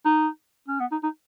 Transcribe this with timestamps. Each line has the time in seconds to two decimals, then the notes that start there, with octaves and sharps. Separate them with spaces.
0.05 D#4
0.68 C#4
0.80 B3
0.92 D#4
1.04 D#4